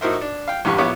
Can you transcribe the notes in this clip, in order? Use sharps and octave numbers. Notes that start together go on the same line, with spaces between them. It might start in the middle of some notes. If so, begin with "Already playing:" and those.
A2 D#4 F#4 A#4 C5 E5
D4
F5 G5
A1 E2 G2 G4 B4 C#6
A#1 B3 E4 C#5 D6